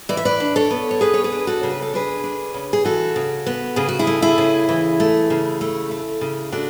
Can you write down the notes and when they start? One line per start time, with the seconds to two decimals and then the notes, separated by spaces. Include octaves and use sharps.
0.09 E3 D5
0.17 E5
0.25 B4 D5
0.40 D4
0.56 A4 C#5
0.71 B3
0.91 C#5
1.01 B3 G#4 B4
1.14 C#5
1.24 G#4 B4
1.32 D4
1.47 F#4 A4
1.63 C#3
1.70 B4
1.82 A4
1.94 D4 G#4 B4
2.24 D4
2.54 C#3
2.73 G#4
2.85 E3 F#4 A4
3.16 C#3
3.46 B3
3.76 C#3 G#4
3.89 F#4
3.99 E4 G#4
4.07 A3
4.22 E4 G#4
4.38 C#3
4.69 E3
5.00 A3
5.30 C#3
5.61 A3
5.91 A3
6.21 C#3
6.52 A3 D4 F#4